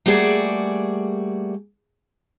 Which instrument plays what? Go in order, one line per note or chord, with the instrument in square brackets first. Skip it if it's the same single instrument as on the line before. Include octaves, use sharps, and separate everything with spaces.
[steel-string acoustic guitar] G3 A3 A#3 F#4 G#4 D5